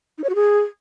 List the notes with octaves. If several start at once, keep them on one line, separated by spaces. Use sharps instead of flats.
D#4
C#5
F#4
G#4